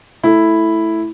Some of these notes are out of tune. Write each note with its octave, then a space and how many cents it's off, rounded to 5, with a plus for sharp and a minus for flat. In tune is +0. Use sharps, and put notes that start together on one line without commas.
A3 +0 E4 +0